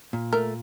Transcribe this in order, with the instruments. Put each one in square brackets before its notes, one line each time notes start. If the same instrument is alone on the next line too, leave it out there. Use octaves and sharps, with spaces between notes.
[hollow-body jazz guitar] A#2
[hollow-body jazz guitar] A3 [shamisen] A#4